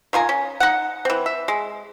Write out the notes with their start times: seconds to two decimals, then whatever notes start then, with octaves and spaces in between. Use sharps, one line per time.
0.13 D#3 F4 G#5 A#5
0.29 C#4
0.60 D#4 F#5
1.05 E3 C4
1.26 E5
1.48 G#3